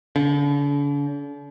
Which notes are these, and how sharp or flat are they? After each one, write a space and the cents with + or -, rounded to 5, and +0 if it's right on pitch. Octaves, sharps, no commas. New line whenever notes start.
D3 -45